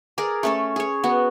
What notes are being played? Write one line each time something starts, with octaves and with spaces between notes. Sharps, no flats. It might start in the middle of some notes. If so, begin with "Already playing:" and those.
G#4 A#4 D5
A3 C#4 A4
G#4 C#5
B3 F#4